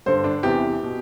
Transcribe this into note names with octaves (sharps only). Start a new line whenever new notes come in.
G2 D3 C5
D4
E2 C3 E3 G4
B2